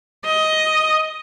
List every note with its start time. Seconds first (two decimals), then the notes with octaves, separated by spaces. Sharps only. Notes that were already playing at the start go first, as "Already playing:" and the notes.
0.25 D#5